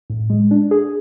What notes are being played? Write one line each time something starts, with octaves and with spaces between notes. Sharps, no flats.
A2
G#3
D4
G#4